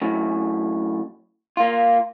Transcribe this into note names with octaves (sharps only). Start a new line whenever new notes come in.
F#2 A2
A#3 F4